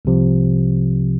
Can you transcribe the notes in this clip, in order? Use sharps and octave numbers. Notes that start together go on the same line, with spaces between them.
C2 C3 F3